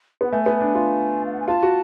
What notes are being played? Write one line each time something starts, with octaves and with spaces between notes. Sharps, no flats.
B3 F#5
A3 G#5
B3
D4
F4
F5
F#5
G#5
F4 A5
F#4